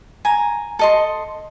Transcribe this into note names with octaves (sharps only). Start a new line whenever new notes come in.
G#5 A#5
A4 D#5 C6